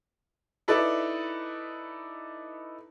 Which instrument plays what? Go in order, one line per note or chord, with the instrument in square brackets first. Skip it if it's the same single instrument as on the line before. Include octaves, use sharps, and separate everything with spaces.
[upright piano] D#4 E4 A4 B4 D5